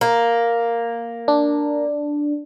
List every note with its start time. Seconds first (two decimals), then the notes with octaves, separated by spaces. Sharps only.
0.01 A#3
1.28 D4